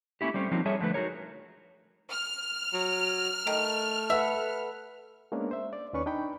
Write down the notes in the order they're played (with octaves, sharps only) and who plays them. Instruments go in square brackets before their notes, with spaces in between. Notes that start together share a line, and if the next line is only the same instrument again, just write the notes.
[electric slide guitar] A3 A#3 C#4 E4 G4
G3 A3 C4 C#4
F3 F#3 A#3 C4 D#4
G3 G#4 A4 C#5 E5
D3 F3 A3 B4
D#4 F#4 G#4 A#4 C#5
[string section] F6
[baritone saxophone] F#3
[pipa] D#3 [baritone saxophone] A3
[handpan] A4 B4 F#5 [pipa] E5
[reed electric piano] G#3 A#3 B3 C#4 D4
C5 E5
D5
D#2 D#3 C#4 B4 D5 C#6
D4 D#4 G5 B5